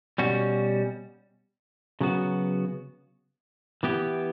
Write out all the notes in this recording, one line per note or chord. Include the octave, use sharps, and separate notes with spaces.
B2 G3 C#4 F#4
C#3 F#3 B3 F#4
E3 B3 E4 G4